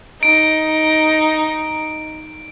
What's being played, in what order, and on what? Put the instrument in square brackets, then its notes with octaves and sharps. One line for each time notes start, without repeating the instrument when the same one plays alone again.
[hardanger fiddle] D#4 [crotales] D7